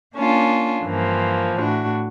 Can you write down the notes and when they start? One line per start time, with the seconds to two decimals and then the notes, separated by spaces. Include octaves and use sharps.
0.15 A#3 C#4 D4 F4
0.83 G2 E3 F3 A#3
1.58 A2 D4 F#4